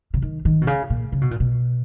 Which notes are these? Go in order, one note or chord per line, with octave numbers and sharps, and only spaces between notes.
C#3
D#3
D#3
B2
C#3
A#2
C#3
B2
A#2
B2